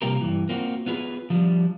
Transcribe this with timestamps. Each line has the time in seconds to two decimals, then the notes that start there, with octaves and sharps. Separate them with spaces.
0.02 C3 G3 A#3 F4 G4 A#4
0.21 G2 E3
0.49 A#3 C4 F4 F#4
0.86 B3 F4 G#4 B4
1.30 F3 G3 D4